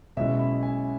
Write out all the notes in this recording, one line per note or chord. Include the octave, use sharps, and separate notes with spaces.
B1 B2 G#3 C#4 E4 E5
B5
G#5